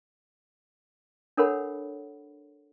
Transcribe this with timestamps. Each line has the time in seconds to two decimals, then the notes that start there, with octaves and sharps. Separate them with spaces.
1.37 D4 A4 A#4 C#5 F#5 B5